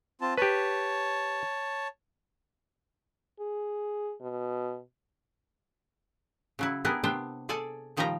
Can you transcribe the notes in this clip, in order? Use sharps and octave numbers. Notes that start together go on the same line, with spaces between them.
C4 F4 A5
G4 B4 C#5 A5
G#4
B2
C#3 F#3 E4
B3 D4 E4 G4 G#4 A#4
C3 B3 D4 C5 G5
G#4 A4 D5 G#5 A5
A#2 D#3 F3 G3 G4 A#5